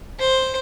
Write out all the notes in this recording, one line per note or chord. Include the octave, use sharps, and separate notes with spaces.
C5